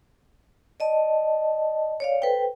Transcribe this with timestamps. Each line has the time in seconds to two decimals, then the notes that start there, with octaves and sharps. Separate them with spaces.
0.80 D5 D#5 A5
2.00 C#5 D5 F5
2.22 A4 B4 C5 G5